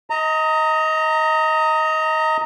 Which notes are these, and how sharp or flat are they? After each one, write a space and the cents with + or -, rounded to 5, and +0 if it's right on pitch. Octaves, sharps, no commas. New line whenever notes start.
D#5 +20 A#5 -20